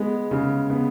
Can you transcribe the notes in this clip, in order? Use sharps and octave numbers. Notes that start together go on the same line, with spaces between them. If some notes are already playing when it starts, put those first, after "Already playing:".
Already playing: G#3 B3
C#3
B3